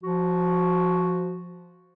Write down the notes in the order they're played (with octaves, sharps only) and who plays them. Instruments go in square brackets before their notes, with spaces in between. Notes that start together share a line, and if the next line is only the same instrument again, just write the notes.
[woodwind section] F3 F#4